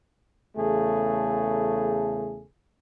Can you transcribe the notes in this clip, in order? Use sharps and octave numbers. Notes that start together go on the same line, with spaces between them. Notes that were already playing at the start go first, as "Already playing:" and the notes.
E2 C#3 A3 G#4 A4